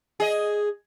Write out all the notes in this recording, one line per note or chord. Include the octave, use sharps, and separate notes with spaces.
G#4 D#5